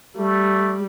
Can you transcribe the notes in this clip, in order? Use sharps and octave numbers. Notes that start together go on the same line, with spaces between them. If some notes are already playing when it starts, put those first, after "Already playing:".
G3 A3